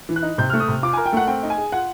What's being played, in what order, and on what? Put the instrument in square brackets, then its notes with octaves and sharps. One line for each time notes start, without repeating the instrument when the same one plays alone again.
[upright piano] E3
[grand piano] F#6
[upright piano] D#4
[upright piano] C3 [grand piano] G6
[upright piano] A3 [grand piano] F6
[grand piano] D#6
[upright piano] C3
[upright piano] F4 [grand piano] D6
[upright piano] A#4 [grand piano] G#5
[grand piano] G5
[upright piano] A3 [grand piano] F#5
[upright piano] C4 [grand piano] G5
[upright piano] D#4
[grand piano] G#5
[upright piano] G#4
[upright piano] F4 [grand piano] F#5